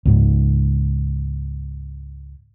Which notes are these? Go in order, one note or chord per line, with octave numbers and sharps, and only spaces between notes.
C#2 G#2